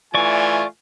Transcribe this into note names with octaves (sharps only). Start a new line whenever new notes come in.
E3 A3 F4 D5 G#5 C#6